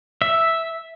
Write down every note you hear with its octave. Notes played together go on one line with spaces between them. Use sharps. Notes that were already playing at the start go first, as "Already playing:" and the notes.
E5